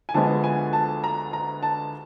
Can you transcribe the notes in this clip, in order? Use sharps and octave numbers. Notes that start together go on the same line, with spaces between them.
G#5
D2 D3 F3 G#3 B3 A5
G#5
A5
A#5
A#5
A5